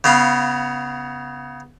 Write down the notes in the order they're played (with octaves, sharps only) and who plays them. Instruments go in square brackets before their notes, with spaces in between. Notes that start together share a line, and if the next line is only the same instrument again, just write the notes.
[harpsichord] C#3 B3 F5